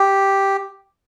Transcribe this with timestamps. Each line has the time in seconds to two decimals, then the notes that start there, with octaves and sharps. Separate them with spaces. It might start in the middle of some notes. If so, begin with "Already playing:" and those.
Already playing: G4